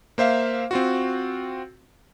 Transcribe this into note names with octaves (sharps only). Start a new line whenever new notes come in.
A#3 C5 E5 F5
C4 F4 F#4